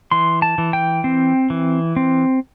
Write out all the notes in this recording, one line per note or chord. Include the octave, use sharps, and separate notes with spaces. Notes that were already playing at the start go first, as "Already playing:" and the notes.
E3 C6
A5
E3
G5
C4
E3
C4